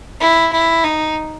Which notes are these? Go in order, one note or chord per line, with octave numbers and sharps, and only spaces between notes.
E4
E4
D#4